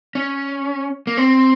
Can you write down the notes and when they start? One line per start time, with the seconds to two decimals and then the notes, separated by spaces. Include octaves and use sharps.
0.15 C#4
1.07 A#3
1.17 C4